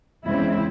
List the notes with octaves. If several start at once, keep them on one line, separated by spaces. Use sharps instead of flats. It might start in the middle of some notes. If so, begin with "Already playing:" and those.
E2 C#3 G#3 C4 E4